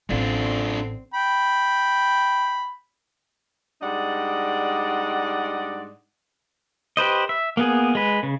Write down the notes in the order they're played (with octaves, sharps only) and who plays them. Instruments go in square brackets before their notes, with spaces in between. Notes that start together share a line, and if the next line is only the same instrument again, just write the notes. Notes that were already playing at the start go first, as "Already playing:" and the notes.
[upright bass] A1 [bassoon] D3 [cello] C4 [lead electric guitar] D4 F4
[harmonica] G5 B5
[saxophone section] G#2 G3 D4 D5 D#5 F#5
[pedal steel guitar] G4 B4 C5 D#5
E5
A#3 B3 G#4
G#3 B4
C#3